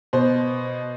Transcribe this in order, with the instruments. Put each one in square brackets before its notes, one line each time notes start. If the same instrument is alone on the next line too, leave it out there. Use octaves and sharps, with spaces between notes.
[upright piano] B2 C5